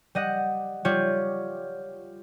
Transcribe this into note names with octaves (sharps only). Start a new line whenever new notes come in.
G3 D#5 F#5
G3 F4 C#5